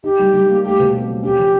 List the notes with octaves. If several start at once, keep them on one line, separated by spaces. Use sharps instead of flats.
D#4 G4
G3
G3
A#3
A3 G4
B2
C4
F#3
C#4 G4
F3